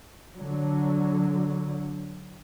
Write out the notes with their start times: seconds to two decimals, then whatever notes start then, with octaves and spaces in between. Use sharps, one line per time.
0.36 D3 F#3